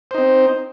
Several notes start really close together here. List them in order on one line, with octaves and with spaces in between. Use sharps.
C5 D#4 C4